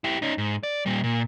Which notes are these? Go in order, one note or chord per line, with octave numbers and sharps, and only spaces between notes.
E4 G4
C#4 D#4
G#2
D5
A#2 G3
A#2